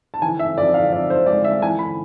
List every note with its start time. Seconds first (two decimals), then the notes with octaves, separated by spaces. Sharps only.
0.14 A5
0.22 E3 G#5
0.39 E5
0.58 F2 D5
0.74 F5
0.93 F2 D5
1.10 C5
1.26 G#3 D5
1.44 E5
1.62 E3 G#5
1.79 B5